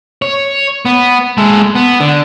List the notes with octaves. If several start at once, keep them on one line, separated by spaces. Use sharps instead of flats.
C#5
B3
G#3 A4
B3
D3